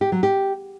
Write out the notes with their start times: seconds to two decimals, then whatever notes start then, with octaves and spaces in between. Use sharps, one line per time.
0.01 G4
0.12 F#3
0.23 G4